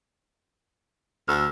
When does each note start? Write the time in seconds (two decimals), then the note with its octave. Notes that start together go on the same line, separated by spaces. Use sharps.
1.28 D2 E6 F6